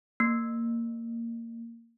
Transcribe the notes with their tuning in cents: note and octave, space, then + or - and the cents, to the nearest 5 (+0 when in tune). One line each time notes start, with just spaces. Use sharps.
A#3 -15